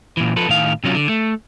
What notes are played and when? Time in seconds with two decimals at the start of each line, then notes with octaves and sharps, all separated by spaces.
0.17 A#2 E3
0.36 F3 A4 B4
0.49 A2 D#3 F5
0.84 C3 F#3 C#4 F4
0.95 D3
1.09 A3